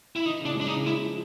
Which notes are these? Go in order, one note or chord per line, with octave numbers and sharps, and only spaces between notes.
E4
E3 D#4
C#3 D4
G#3
D4
D#4
C#3
G#3 E4
F3